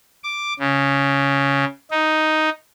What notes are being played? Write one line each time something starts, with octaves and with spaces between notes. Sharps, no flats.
D6
C#3
D#4